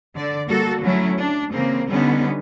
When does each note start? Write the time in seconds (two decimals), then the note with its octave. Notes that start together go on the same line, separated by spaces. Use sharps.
0.15 D3 D5
0.48 G3 A#3 F#4 A4
0.83 D3 F#3 A3 C#4 E4
1.20 D4
1.52 C#3 E3 A#3 C4
1.91 D3 G3 B3 C#4 D#4